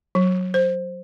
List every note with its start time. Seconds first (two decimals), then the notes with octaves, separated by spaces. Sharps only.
0.15 F#3
0.54 C5